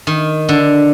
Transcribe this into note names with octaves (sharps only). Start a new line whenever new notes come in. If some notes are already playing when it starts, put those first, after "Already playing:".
D#3
D3